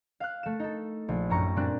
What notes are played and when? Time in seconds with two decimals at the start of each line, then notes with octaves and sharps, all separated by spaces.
0.20 F5 F#6
0.43 A3 E7
0.59 D#4 A4
1.08 A#1
1.29 F#2 A2 A3 A#5 C#6
1.56 A#2 G3 C4 D4 F#6